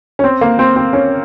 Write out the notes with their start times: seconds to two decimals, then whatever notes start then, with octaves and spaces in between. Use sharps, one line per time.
0.19 C#4
0.24 C4
0.41 A#3
0.59 C4
0.76 C4
0.93 C#4